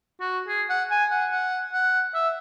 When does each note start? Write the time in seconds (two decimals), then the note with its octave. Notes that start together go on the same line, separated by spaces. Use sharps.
0.20 F#4
0.48 G#4
0.69 F#5
0.90 G#5
1.11 F#5
1.31 F#5
1.73 F#5
2.14 E5